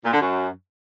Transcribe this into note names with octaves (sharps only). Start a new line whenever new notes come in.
A#2
D3
F#2